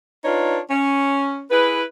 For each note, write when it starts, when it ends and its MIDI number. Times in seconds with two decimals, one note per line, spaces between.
0.25 0.59 62
0.25 0.59 63
0.25 0.59 65
0.25 0.59 71
0.25 0.59 73
0.70 1.43 61
1.51 1.83 64
1.51 1.83 68
1.51 1.83 71